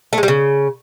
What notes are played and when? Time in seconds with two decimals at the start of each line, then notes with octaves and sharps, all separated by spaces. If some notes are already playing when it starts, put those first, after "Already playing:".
0.13 A3
0.18 G#3
0.23 G3
0.28 C#3